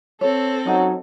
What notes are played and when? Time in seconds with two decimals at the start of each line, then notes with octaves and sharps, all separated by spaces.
0.21 C4 A4 C#5
0.65 F#3 C#4 D#4 F#5